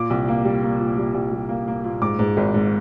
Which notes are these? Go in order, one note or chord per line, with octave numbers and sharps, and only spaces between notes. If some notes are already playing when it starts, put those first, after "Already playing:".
Already playing: A#2 D6
C2
A#3
G3
A#3
A#2
G3
C2
G3
A#3
A#3
A#2
G#2 D6
G#2
G#1
G#2